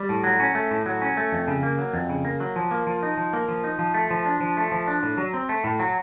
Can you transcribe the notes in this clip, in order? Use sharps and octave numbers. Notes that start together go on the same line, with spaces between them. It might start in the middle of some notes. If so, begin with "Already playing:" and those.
Already playing: G3
A2
F#3
C#4
A3
A2
F#3
C#4
A3
F2
C#3
A#3
F#3
F2
C#3
A#3
F#3
F3
A#3
F3
D#4
F3
A#3
F3
D#4
F3
A3
F3
D4
F3
A3
F3
D4
A2
F#3
C4
A3
A2
F#3